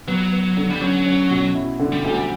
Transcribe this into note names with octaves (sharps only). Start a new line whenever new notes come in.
F#3 B3
B3
D3
G3
F#3 C#4
C#4
B2
E4
D3
G3
D2